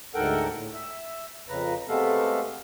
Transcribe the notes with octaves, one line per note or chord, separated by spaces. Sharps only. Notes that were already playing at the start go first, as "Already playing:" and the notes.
D2 G#2 A4 A#4 F#5 G5
A2
E5
F2 C#3 B4 A#5
C3 G#3 A3 B3 A4 F5